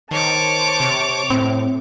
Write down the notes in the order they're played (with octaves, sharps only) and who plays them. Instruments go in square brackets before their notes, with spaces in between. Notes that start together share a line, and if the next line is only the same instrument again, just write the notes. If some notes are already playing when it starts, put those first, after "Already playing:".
[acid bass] D#3 [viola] C5 A5 [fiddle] C#5 D6
[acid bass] C3
[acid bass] A2 [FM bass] C4